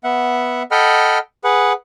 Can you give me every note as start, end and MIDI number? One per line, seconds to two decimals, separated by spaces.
0.04 0.63 59
0.04 0.63 76
0.04 0.63 78
0.71 1.18 69
0.71 1.18 75
0.71 1.18 78
0.71 1.18 79
0.71 1.18 83
0.71 1.18 89
1.44 1.73 68
1.44 1.73 71
1.44 1.73 78